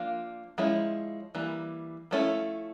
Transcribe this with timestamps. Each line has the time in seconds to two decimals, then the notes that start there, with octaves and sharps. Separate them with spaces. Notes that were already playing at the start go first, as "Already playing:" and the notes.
Already playing: F3 A#3 D4 F4
0.58 F3 G#3 C#4 E4
1.35 E3 G3 A#3
2.11 F3 A3 C#4 E4 A4